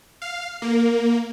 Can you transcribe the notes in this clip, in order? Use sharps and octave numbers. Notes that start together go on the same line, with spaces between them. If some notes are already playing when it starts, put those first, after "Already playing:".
F5
A#3